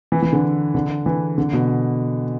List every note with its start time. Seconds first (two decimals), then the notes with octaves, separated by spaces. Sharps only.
0.12 E3
0.22 E3
0.33 D3
0.75 D3
1.06 E3
1.38 D3
1.53 B2